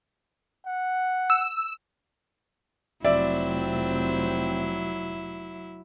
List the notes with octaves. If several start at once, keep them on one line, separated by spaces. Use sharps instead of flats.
F#5
E6
F1 F3 F#3 C4 E4 D5 E5